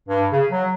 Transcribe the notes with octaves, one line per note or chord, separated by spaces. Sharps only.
G2
C#3
F#3